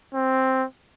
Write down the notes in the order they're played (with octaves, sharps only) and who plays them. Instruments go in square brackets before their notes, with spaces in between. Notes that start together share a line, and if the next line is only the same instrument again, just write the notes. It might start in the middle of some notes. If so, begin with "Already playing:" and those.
[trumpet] C4